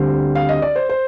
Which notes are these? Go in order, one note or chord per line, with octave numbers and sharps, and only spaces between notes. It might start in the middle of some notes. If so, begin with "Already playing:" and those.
Already playing: D2 D3 G3 C4 C5
F5
D#5
D5
C5
C5